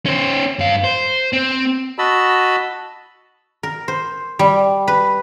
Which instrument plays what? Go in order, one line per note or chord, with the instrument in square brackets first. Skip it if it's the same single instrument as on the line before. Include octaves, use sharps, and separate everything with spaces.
[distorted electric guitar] C#4 C5
G2 F5
C5
C4
[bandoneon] F#4 D#5 A5 B5 E6
[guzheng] A#4
C5
G3
B4